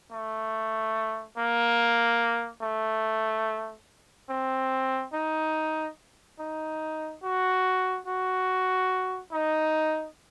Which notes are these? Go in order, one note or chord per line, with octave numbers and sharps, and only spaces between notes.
A3
A#3
A3
C4
D#4
D#4
F#4
F#4
D#4